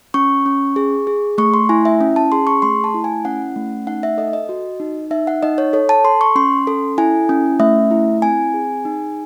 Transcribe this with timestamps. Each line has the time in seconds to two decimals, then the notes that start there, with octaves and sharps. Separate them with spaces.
0.14 C#4 C#6
0.46 C#4
0.76 G#4
1.07 G#4
1.38 A3 C#6
1.54 C6
1.69 E4 G#5
1.85 E5
2.01 C#4
2.16 A5
2.32 G#4 C6
2.47 C#6
2.62 A3 C6
2.84 A5
2.94 E4
3.04 G#5
3.25 C#4 F#5
3.56 A3
3.87 D#4 F#5
4.03 E5
4.18 A4 D#5
4.33 D#5
4.49 F#4
4.80 D#4
5.11 D#4 E5
5.27 F#5
5.43 D#4 D#5
5.58 C#5
5.73 A4 C#5
5.89 A5
6.04 A4 C6
6.21 C#6
6.35 C#4 C6
6.67 A4
6.98 E4 G#5
7.29 C#4
7.60 A3 E5
7.91 E4
8.22 C4 G#5
8.54 G#4
8.85 D#4